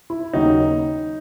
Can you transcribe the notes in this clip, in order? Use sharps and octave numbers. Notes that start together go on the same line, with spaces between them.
E4
D#2 C#3 F#3 D#4